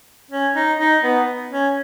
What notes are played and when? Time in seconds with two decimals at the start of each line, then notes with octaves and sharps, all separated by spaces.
0.31 C#4
0.56 D#4
0.79 D#4
1.04 B3
1.52 C#4